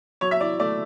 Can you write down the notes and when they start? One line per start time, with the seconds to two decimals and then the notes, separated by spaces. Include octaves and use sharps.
0.21 F#3 C#5
0.31 E5
0.40 E4 D5
0.59 A3 D5